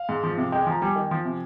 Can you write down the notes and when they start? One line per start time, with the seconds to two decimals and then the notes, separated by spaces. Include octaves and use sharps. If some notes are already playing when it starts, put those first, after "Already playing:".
Already playing: F5
0.09 G#2
0.23 F3
0.37 C3
0.52 G#3 G5
0.62 G#5
0.67 F3 A#5
0.82 G3 G#5
0.96 D#3
1.11 F3
1.25 C3